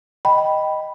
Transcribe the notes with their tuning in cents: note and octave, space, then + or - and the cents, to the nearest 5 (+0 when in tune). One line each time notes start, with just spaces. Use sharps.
D#5 +0 G5 -5 B5 +0